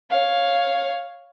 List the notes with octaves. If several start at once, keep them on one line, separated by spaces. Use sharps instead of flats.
C#5 F5